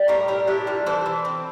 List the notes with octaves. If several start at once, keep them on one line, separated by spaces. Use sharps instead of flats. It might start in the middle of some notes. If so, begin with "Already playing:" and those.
Already playing: G3
A2 G4 A#4
A2 G4 A#4
D4 E4 G4
G3 F4
E3 A4 C5
E3
C4